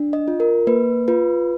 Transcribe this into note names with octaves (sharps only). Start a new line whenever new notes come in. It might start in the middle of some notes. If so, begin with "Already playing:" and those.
Already playing: D4
D#5
F4
A#4
A#3 B4
F4 B4